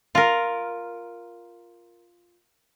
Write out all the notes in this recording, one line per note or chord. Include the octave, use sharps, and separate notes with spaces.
F4 A#4